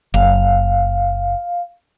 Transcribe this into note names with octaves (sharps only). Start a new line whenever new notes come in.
F#1 F5